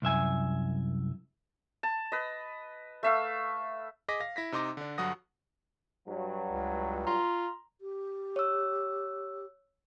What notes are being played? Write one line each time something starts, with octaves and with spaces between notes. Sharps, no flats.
C2 F#2 E5 G#5
A5
B4 D#5
A3 E5 F5
G#4 D#5 D6 A#6 B6
F5 A#6
E4 A#6 B6
C3 D#4 C6 D6 A#6
D3 D4
G2 D3 F#3 F#5 D#6 A#6
G2 F#3
C#2
F4 A#5 C6
G4
C#5 E6